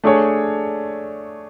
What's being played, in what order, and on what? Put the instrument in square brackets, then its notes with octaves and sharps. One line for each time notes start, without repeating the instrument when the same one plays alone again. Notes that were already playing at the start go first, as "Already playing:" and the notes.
[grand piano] A3 D4 G#4 C#5